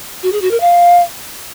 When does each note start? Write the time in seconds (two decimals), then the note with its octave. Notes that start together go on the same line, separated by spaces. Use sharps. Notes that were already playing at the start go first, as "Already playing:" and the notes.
0.23 F#4
0.32 G#4
0.42 F#4
0.51 A#4
0.60 F5